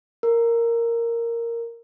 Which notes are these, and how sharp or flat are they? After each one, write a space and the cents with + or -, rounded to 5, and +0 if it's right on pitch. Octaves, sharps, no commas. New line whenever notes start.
A#4 -5